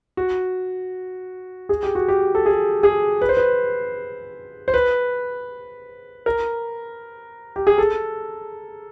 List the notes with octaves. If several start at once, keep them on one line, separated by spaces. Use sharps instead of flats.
F#4
G#4
G4
F#4
G4
A4
G#4
G#4
B4
C5
B4
C5
B4
A#4
G4
G#4
A4